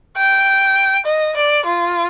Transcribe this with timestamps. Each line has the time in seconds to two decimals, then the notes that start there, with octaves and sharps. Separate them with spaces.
0.17 G5
1.06 D#5
1.36 D5
1.65 F4